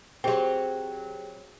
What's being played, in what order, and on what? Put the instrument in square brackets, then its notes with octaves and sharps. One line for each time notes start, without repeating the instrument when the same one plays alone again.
[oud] F#3 C4 [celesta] G4 G#4 G5